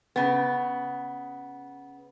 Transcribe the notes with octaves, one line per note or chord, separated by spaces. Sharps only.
C#3 B3